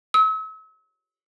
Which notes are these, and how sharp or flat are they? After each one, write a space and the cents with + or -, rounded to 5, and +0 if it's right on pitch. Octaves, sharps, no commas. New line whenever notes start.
E6 -40